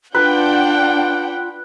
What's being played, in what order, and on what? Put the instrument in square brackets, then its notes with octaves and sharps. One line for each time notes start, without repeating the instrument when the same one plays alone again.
[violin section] D4 F#5 G5 [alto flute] F4 [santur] B4